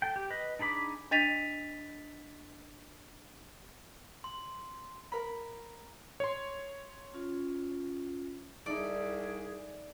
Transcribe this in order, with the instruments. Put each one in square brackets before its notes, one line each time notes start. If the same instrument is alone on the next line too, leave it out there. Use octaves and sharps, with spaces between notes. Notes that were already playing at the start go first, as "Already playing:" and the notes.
[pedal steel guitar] A4 G5
G4
B4 D#5
D4 D#4 G#4 B5 D6
[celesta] D4 D#5 A6 B6 D#7 F7
[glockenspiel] C6
[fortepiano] A#4 B5
[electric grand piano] C#5 C6
[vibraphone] C#4 F4
[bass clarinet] C2 [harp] D#4 E4 A4 [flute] G#4 [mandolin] D5